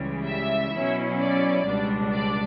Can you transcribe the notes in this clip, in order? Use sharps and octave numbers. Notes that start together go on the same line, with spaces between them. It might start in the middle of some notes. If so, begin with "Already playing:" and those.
Already playing: C#2 C#3 E3 G3
E5
B2 F#3 C#4 E4
D5
C#2 B2 G3 D4
D5